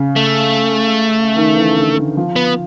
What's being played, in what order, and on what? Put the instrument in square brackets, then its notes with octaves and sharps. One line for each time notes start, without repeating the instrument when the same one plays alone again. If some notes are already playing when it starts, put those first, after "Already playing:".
Already playing: [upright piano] C#3
[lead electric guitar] A3
[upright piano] D#3
E3
D3
D3
F3
[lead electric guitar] B3